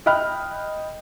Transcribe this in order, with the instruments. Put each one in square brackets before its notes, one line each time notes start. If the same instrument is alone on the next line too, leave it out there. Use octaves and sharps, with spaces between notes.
[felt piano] D#5 G5 B5 F6 F#6